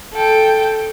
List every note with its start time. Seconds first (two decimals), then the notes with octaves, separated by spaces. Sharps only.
0.14 A4 G5